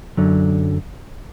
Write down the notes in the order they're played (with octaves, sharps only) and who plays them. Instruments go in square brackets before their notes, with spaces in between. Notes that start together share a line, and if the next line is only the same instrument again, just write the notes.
[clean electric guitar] F#2 D3 F#3